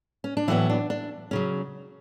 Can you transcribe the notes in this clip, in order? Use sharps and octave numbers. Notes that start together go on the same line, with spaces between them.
C#4
D4
A2 E3 F#3 B3 E4
D4
D4
C#3 F#3 C#4